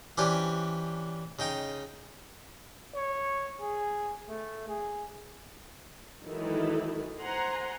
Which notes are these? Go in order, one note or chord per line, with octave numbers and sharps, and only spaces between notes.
E3 C#4 D4 G4 C5 C#5
C#3 D#4 G5 D#6
C#5
G#4
A3
G#4
D#3 E3 F#3 G#3 E4 A4
C5 F#5 G#5 A#5 C6